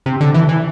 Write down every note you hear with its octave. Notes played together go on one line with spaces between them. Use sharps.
C3
D3
E3
E3